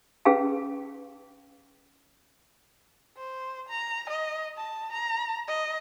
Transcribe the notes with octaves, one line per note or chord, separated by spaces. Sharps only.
C#4 G#4 B4 F5 A5
C5
A#5
D#5
A5
A#5
D#5